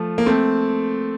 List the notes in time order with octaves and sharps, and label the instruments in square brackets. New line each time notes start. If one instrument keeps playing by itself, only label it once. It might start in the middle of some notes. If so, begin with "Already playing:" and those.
Already playing: [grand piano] F3 A3
A#3
A3 C4